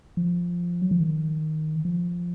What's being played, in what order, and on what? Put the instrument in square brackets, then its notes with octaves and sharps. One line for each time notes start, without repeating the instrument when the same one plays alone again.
[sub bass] F3
F#3
F3
D#3
F3